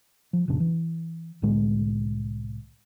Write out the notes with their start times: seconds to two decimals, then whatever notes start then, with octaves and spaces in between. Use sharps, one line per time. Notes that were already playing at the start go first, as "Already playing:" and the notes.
0.33 F3
0.48 F1 A#1 C#3 D4
0.60 E3
1.42 C2 A2 D3 G#3